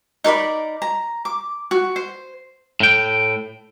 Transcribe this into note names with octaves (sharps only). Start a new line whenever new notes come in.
D#4 A#4 D5 B5
A#5
D6
F#4
C5
A2 G5